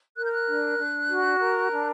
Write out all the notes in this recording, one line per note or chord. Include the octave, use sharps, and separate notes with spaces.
A#4 F#6
G6
F#6
D4
D4
F#4
A#4
D4